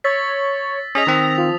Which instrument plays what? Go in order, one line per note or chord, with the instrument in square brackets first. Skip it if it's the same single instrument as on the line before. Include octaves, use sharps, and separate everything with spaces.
[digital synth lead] C#5 [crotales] E6 A6 B6
[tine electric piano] C#4 G#4 D#5 [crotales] D#6 B6 F7 [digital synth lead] A#6
[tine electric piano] D#3 C4
[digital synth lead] F3